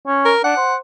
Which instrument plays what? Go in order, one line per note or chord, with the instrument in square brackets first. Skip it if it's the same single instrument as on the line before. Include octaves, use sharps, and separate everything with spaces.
[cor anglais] C#4
[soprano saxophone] A#4
[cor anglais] D4 [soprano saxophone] F#5
[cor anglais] C5